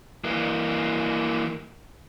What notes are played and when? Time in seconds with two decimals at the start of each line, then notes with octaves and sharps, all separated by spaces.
0.24 E3 A#3